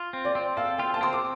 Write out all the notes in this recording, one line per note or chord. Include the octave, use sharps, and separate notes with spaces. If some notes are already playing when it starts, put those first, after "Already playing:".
Already playing: F4
C4
D5
C4
A4 F5
F4 G5
A5
C4 C6
D6